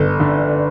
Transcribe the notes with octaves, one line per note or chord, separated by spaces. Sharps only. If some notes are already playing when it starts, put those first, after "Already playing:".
Already playing: G1 A4
D3